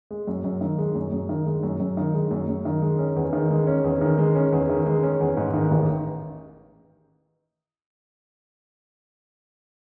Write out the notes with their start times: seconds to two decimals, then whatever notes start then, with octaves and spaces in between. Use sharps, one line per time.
0.11 G#3
0.27 F#2
0.44 F#2
0.61 D#3
0.78 G#3
0.95 F#2
1.12 F#2
1.29 D#3
1.46 G#3
1.63 F#2
1.80 F#2
1.97 D#3
2.14 G#3
2.31 F#2
2.48 F#2
2.65 D#3
2.82 G#3
2.99 C#4
3.16 E2
3.33 D#3
3.50 G#3
3.67 C#4
3.84 E2
4.01 D#3
4.18 G#3
4.35 C#4
4.52 E2
4.70 D#3
4.86 G#3
5.03 C#4
5.20 E2
5.37 G#2
5.54 D#3
5.71 A1